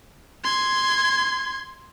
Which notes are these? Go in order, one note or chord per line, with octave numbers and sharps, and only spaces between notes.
C6 G#6